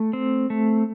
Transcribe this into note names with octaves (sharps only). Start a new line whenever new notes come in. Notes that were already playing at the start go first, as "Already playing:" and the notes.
Already playing: A3
C4
A3